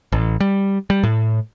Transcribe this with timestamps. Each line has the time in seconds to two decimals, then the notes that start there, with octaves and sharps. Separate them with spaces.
0.12 A1
0.40 G3
0.90 G3
1.03 A2